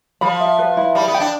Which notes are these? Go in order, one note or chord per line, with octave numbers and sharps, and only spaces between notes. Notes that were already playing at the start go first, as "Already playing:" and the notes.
F3 B5
E5
B4
E4
G3 B5
B3
G5
D4